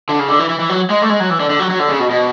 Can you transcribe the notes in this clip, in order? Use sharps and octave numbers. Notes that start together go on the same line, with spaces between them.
D3
C#3
D3
E3
E3
E3
F#3
G#3
A3
G#3
F#3
E3
D3
D3
F#3
F#3
D3
C#3
B2
B2